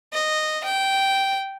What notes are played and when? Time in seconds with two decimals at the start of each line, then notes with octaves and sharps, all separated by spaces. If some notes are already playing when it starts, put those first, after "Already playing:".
0.13 D#5
0.64 G5